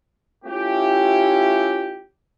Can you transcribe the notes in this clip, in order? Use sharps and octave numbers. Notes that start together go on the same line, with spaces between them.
A3 C#4 E4 F4 G4